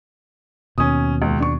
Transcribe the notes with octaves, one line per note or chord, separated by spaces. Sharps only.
D#2 B2 C#4 D#6
C#2
D4 C#6